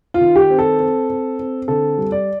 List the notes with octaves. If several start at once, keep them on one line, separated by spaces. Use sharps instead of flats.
F4
D#3
G4
C4
A4
C4
C4
C4
D3 A4
G3
D5